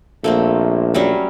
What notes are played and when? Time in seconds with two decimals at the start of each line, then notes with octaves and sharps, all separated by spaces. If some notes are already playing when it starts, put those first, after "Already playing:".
0.24 A#1 A3 A#3 C4
0.94 F#3 G3 C#4